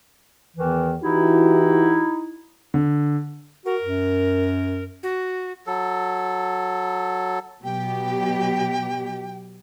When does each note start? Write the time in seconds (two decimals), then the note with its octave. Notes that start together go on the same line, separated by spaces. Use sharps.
0.57 E2 D#3 E3
1.03 E3 D#4 E4 F#4 G4
2.74 D3
3.66 F#4 A#4
3.82 F#2
5.03 F#4
5.67 F#3 A4
7.64 B2 F#3 G4 G5